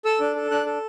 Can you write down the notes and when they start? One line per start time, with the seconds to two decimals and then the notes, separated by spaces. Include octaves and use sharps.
0.05 A4 E6
0.21 D4
0.36 A4
0.51 D4 F#6
0.66 A4